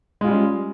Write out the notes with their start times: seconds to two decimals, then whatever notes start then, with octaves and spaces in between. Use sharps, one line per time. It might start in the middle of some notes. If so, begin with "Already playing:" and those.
0.21 G#3
0.24 F4
0.28 G3
0.31 C#4